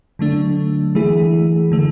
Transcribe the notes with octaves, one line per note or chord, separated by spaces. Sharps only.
D3 F#3 A3 D4
E3 A3 E4 G#4
D3 A3